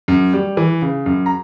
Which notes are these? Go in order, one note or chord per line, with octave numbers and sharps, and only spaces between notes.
F#2
G3
E3
C#3
F#2
A#5